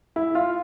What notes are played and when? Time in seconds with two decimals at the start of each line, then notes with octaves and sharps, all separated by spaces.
0.16 E4
0.35 F4